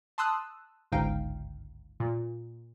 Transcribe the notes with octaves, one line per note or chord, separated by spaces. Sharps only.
A5 C6 D#6 E6 F#6
G1 C#2 G#2 D#4 F5 G5
A#2